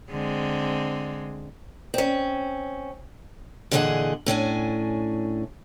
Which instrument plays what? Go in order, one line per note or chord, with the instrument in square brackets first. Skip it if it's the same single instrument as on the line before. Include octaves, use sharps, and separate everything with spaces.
[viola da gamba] D3 G#3 C4
[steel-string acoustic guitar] C4 C#4
A#2 D3 E3 G#4 D#5 F#5
A2 C#4 D4 G#5